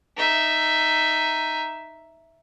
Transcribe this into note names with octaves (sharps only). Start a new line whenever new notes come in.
D#4 E5